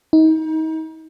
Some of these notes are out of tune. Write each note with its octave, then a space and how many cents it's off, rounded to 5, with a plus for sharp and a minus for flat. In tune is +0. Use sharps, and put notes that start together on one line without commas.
D#4 +30